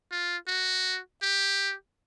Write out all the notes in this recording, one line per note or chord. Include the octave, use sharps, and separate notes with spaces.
F4
F#4
G4